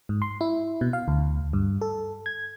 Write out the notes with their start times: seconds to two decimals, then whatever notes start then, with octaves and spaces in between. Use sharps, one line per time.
0.09 G#2
0.22 C6
0.41 E4
0.81 B2
0.93 F5
1.08 D2
1.53 G2
1.81 A4
2.26 G#6